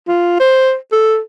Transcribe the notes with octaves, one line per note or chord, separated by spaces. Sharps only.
F4
C5
A4